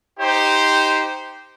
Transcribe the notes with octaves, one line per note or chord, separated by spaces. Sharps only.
D#4 G4 C5